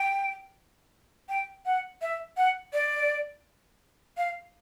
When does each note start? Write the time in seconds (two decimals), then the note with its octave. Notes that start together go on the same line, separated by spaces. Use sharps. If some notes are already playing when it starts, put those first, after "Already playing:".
Already playing: G5
1.29 G5
1.66 F#5
2.02 E5
2.37 F#5
2.73 D5
4.18 F5